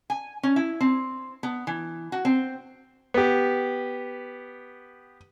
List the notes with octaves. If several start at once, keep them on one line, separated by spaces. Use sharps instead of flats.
G#5
C#4
E4
C4
B3
E3
F#4
C4
B3 G4